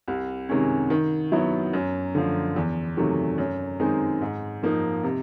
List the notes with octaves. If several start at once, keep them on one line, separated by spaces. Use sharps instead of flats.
C2
C3 D#3 G#3 C#4
D#3
F#3 B3 E4
F#2
D3 F3 A3
E2
C3 D#3 F#3 A3
F#2
D#3 G#3 C4 D#4
G#2
F3 A#3 D#4
C3